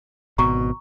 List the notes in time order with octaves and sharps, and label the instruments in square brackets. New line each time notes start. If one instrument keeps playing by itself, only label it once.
[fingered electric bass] G#1 B2 [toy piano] A#5 C#6